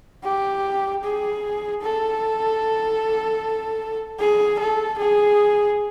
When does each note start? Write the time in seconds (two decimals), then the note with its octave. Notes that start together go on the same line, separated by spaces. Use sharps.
0.24 G4
1.04 G#4
1.83 A4
4.20 G#4
4.59 A4
4.99 G#4